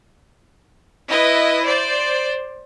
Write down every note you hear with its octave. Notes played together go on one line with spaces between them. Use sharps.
E4 B4 D#5
C5 D5